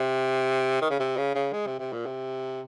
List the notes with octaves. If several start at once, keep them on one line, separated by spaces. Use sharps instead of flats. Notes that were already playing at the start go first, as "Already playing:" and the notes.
Already playing: C3
D#3
C#3
C3
C#3
C#3
G#3
C3
C3
A#2
C3